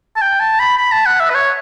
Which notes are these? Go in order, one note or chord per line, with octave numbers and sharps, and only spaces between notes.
A5
G5
A5
B5
B5
A5
F#5
E5
B4
C#5